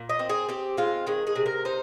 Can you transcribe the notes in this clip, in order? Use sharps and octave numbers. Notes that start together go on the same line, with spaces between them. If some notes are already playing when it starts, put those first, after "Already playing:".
Already playing: A#2
D#5
C4
G#4
C4 G4
G#3 F4
D#3 G#4
G#4
C3
A#4
D#4 C5